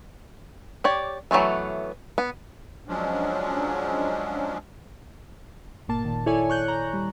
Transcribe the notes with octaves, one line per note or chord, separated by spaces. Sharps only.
G4 C#5 D5
E3 F#3 G#3 A3 B3
B3
F3 F#3 G#3 C#4 D4
G1 A#2 A#3 A5
A#2 D#3
E4 A4 C#5 D5 G#5
C#6 F#6 G6
A#5
G3